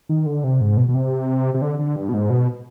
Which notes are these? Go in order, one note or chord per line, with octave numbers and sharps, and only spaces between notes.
D#3
D3
C3
G#2
B2
B2
C3
C3
D3
D3
G2
B2
G#2
B2